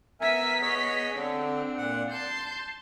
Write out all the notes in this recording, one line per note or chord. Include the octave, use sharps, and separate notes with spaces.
B3 A#4 E5 G#5 B6
G#4 C#5 D#5
D3 C4 D4
A#2 F#5
A5 C6 G6